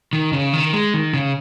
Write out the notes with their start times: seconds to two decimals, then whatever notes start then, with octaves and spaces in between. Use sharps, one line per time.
0.13 D#3
0.33 C#3
0.53 D#3
0.73 G#3
0.94 D#3
1.14 C#3